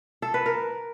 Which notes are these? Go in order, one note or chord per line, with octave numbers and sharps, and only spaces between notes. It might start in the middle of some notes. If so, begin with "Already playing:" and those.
A4
B4
A#4